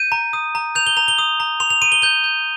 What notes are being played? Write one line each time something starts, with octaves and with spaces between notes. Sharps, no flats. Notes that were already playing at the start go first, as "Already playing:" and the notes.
Already playing: G6 D#7
A#5
D#6
A#5
G6 F7
G7
A#5 F7
G7
D#6
A#5
C6 F7
F7
C6 D#7
G7
G6 G7
G6